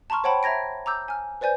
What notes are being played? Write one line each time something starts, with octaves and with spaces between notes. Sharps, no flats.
A5 A#5 C6 C#6 F6
C5 C#5 F#5 G5 A5 B5
E5 A#5 G#6 A#6 D7
A#5 D6 E6 G6
G#5 F6
B4 C5 D5 G#5 G6